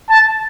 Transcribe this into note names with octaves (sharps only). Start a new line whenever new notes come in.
A5